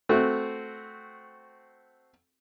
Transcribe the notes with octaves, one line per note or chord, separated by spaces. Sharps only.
A3 C4 F#4